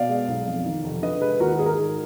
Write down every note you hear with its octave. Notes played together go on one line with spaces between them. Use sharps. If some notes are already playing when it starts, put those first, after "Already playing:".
Already playing: B2 D5 F5
G#3
B1
F2
D#3
F1
D3 B4 D#5
G#3 G#4 B4
D#2 F#4 A#4
G#2 G#4
A#4
D#3 G#4